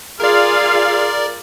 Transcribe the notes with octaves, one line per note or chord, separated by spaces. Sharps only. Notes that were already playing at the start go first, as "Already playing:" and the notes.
F4 G#4 A#4 D5 F5